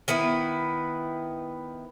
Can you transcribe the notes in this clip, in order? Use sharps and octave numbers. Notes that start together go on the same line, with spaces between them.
D#3 B3 E4 B4